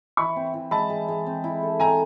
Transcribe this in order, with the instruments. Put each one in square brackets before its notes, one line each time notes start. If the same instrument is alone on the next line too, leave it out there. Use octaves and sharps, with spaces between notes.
[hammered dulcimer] E3 [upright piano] B5 C#6
[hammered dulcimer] C4
E3
[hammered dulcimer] G#3 [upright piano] A5 B5
[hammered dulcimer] G#3
G#3
C4
E4
A4
[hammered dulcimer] C4 [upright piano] G#5 A#5